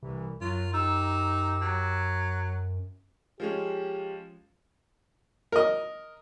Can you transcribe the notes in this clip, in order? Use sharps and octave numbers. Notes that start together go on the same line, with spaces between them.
C2 C3 E3
F#2 F#3 F4
D#4 G4 A#5 E6
F#3
F3 G#3 C#4 G4
A#4 D#5